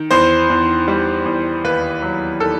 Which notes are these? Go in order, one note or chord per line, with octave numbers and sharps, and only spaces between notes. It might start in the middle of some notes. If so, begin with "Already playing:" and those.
Already playing: D#3
E2 C5
E2
G3
E2
D#2 B4
F#3
D#3 A4